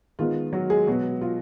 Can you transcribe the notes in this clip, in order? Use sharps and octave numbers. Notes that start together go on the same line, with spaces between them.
D#3 G#3 B3 F4
F#3 F#4
G#3 G#4
B2 F#3 G#3 B3 F#4
F4